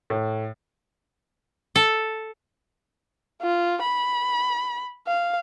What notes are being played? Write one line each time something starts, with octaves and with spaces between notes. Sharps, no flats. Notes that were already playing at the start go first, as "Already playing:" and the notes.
A2
A4
F4
B5
F5